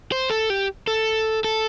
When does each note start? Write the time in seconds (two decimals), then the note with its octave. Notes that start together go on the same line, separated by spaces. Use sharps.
0.12 C5
0.30 A4
0.50 G4
0.87 A4
1.44 A4